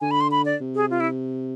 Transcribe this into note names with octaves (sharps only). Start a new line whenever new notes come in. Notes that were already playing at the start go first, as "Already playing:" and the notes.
D3 G#5
B5
C6
B5
D5
C3
G#4
F4
E4